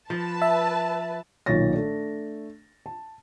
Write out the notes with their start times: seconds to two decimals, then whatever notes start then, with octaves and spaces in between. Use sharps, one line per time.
0.10 F3 B4 A5
0.42 E5
1.46 B1 A#2 D#3 C#5 A6 A#6
1.73 A3 D4
2.86 A5